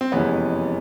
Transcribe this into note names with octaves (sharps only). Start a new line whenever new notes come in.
C4
F#1 F2 C3 E3 G#3 B3 C#4